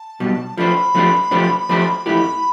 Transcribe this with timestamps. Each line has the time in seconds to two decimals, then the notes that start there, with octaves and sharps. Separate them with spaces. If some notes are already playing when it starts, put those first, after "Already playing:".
Already playing: A5
0.20 B1 B2 G3
0.57 F3 A3 D4 G4 C5 B5
0.95 F3 A3 D4 G4 C5
1.31 F3 A3 D4 G4 C5
1.69 F3 A3 D4 G4 C5
2.06 F2 E3 A3 E4 G4 B5